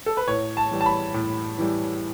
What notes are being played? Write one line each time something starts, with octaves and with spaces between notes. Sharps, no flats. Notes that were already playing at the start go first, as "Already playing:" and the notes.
A4
B4
A2 C#5
A5
E3 G3
A5
B5
A2
E3 G3